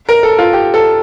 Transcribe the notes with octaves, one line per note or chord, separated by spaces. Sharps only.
A#4
A4
F4
G4
A4